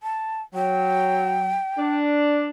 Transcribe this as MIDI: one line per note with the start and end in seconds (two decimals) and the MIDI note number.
0.03 0.42 81
0.54 1.56 54
0.54 1.96 79
1.78 2.50 62